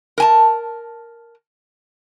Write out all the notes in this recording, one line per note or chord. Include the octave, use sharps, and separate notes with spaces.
A#4 G#5 A5